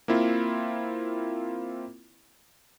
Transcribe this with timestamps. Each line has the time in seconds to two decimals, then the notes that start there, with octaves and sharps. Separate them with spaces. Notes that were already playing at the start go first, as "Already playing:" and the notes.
0.08 A#3 C4 E4 F4